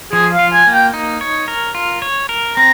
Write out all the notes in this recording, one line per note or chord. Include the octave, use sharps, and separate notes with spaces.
F3 G#4
F5
F4
G#5
A#3
G5
D#4
C#5
A#4
F4
C#5
A#4
C4 A#5